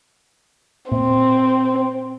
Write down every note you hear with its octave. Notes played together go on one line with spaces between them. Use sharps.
A#2 C4